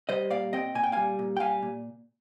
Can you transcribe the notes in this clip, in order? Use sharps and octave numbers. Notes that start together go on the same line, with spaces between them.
G3 C5 D#5
A#2 D5 F5
C4 D#5 G5
A#2 G#5
G5
G3 F5 G#5
A#2
G5
G3 F5 G#5
A#2